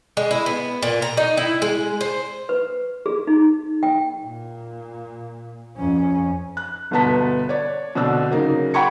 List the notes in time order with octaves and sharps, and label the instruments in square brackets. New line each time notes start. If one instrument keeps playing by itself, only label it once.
[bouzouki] G#3
E4
B3
A#2
A#5
D#4
E4
G#3
C5
[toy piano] B4
G#4
D#4
G5
[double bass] A#2
F2 C#4
[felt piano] F#6
G1 B2 B3 A5 B6
C#5 D5
B2 D3 C4 D4 E6
C#3 F#3 A#3 D#4
F#5 G5 B5 C#6 G#6 C#7